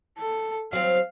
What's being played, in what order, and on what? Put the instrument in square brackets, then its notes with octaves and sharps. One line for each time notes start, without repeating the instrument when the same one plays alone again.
[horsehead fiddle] A4
[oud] F#3 C4 [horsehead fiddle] F5